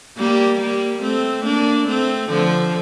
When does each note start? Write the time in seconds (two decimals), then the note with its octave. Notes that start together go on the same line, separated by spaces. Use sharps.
0.17 G3 A#3
0.60 G3 A#3
1.02 A3 C4
1.44 A#3 D4
1.87 A3 C4
2.30 D3 F3